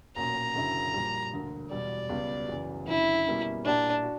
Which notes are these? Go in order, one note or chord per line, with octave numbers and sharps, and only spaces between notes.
B1 A#2 A#3 C#4 F#4 A#5
F#1 F#2 D3 A#3 E4
A#1 A#2 G3
E1 D2 D3 A#3
E1 E2 B2 G3 D5
C#2 B2 G3 B3
F#1 F#2 E3
F#1 F#2 D3 E4
B2 G3 A#3 C#4
A#2 A#3 D4 E4 G4
F#4